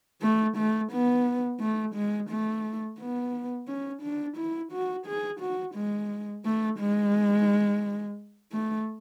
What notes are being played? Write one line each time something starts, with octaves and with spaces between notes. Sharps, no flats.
A3
A3
B3
A3
G#3
A3
B3
C#4
D4
E4
F#4
G#4
F#4
G#3
A3
G#3
A3